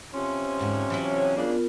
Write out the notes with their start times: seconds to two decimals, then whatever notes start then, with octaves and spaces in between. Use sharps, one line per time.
0.14 C3 F3 C#4 C6
0.59 E2 G#2 D3
0.90 E3 F#3 E4
1.36 C#3 A#3 B3 D4 F4 A#4